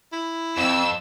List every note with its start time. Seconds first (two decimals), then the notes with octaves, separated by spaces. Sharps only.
0.13 E4
0.58 F2 C4 E6